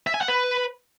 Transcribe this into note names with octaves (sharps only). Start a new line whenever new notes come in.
E5
G#5
F#5
B4